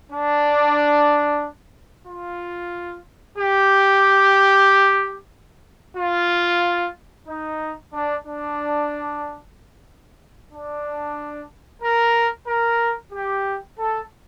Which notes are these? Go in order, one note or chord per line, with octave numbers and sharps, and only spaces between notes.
D4
F4
G4
F4
D#4
D4
D4
D4
A#4
A#4
G4
A4